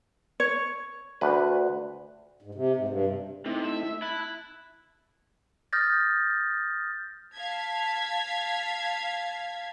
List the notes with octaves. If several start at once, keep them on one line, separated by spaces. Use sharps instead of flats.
C#5
D2 B4
G#2
C3
G#2
G2
C3
C3 A3 D#4 E4
E5
E4 A5 F#6
D#6 F6 G6 A6 A#6
F5 A5 G#6 B6